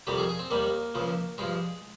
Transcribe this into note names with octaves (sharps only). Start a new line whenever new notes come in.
F2 C3 D#3 G3 G4
G#4
G#4
C4
D#2 D#3 G3 A#3
C#2 C#3 F3
G2 F3 G#3